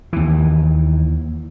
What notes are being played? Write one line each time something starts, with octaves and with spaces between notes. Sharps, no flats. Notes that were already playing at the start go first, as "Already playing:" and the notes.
D#2 E3